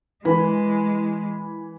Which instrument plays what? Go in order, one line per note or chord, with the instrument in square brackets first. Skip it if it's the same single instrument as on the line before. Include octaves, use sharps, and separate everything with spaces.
[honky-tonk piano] E3 [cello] G#3 [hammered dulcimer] B4